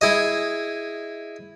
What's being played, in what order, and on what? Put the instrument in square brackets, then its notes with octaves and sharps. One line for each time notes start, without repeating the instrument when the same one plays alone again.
[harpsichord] E4 G#4 D#5